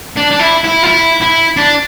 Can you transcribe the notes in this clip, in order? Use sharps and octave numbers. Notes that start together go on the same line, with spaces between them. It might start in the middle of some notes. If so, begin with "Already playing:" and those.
D4
D4
E4
E4
F4
E4
E4
D4